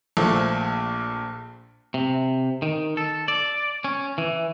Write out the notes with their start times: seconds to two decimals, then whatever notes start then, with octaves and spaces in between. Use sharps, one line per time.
0.17 A#1 A#2 F3 A3
1.94 C3
2.62 D#3
2.97 A4
3.28 D5
3.84 C#4
4.18 E3